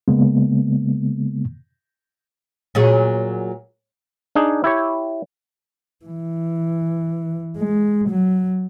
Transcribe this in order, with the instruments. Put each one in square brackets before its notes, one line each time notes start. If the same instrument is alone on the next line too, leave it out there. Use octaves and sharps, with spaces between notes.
[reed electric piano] C#3 G#3 A#3 B3
[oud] A#2 F#3 G#4
[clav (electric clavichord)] D4 D#4 G#4
E4 G4 C#5
[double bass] E3
G#3
F#3